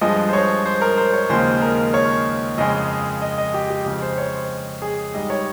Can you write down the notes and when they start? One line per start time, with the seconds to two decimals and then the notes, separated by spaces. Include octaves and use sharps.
0.01 G2 F3 G#3 D#5
0.29 C5
0.33 C#5
0.66 C5
0.81 A#4
0.98 C5
1.14 C#5
1.29 D#2 C#3 F3 G#3 C5
1.62 A#4
1.94 C#5
2.58 F2 C#3 F3 G#3 D#5
3.22 D#5
3.38 D#5
3.54 G4
3.70 G4
3.86 F2 C#3 G#3
4.02 C5
4.18 C#5
4.34 C5
4.82 G#4
5.14 G#2 G3 D#5
5.30 C#5